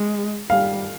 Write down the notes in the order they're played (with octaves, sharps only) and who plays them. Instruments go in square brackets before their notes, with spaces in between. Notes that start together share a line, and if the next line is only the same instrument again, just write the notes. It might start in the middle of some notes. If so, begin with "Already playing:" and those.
Already playing: [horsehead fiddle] G#3
[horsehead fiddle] G3 [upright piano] F5